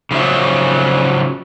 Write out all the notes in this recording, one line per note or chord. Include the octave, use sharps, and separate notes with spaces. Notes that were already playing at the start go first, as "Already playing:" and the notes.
C#3 F3 F#3 E5